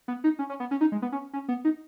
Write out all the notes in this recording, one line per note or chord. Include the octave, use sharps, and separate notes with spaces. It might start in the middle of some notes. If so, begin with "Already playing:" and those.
B3
D#4
C#4
C#4
B3
C#4
D#4
G#3
B3
C#4
C#4
B3
D#4